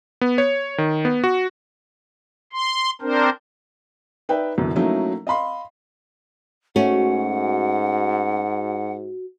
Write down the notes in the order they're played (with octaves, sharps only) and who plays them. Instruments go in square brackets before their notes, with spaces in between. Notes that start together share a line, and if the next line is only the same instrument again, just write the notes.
[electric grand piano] B3
C#5
D#3
B3
F#4
[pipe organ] C6
C4 D4 A#4 C5
[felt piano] D#4 B4 D5 E5 G5
C2 F#2 B2 D3 E3
F#3 A3 A#3 C#4 D#4 E4
D#5 F5 B5 C6
[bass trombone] G#2 [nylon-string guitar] A3 C#4 [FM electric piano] F#4 [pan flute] F#5